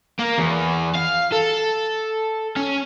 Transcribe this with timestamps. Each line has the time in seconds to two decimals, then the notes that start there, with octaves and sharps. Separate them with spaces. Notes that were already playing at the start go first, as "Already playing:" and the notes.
0.19 A#3
0.39 E2
0.95 F5
1.32 A4
2.56 C#4